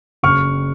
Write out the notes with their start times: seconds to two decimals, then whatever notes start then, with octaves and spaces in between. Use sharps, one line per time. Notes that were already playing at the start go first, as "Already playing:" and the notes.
0.23 F#1 C#6 F6